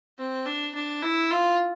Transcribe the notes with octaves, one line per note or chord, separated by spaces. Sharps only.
C4
D4
D4
E4
F4